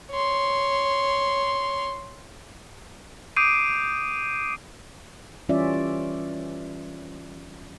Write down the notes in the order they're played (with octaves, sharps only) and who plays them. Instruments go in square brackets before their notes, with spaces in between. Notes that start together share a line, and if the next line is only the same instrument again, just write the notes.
[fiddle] C#5 C6
[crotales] D6 D#6 G6 C7 D7 D#7
[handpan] E3 G3 C#4 F4 D5 E5